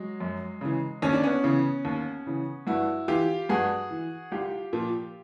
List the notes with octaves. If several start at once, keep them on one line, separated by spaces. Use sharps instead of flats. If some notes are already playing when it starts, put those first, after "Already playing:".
Already playing: F#3 G#3
F#2
C#3 E3
D#2 C#4
D4
B3 C#4
C#3 E3
D#2
C#3 E3
G2 E4 F#4
E3 F4 G4
G2 F#4 G#4
E3
C2 F4 G4
A#2 F3